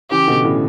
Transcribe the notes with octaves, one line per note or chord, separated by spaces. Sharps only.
C#3 E3 G4
B2 D3
A2 C#3